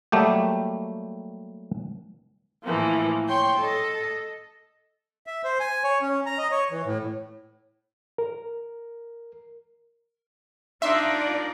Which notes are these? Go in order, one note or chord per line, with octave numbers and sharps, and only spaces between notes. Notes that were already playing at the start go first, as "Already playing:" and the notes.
F#3 G3 A3 A#3 G4
A2 E3 F3 A#3
C#5 G5 C6 G6
A4 D#5
E5
C5
G#5
C#5
C#4
A#5
D#5
C#5
E3
A2
A#4
D4 D#4 F4 A#4 D5 E5 C6